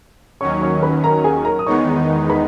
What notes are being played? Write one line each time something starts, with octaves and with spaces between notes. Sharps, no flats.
D#2 D#3 F#3 C#4 C#5 C#6
C#5 C#6
B4 B5
A#4 A#5
G#4 G#5
A#4 A#5
D#6
E2 D#3 G#3 B3 D#4 C#5 C#6
B4 B5